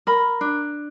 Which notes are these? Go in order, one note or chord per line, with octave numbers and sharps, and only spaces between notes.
A#4 B5
D4